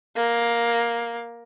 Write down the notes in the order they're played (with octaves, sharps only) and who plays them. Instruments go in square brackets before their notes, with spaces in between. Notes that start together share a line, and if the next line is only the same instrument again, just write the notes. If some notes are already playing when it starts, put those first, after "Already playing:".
[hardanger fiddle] A#3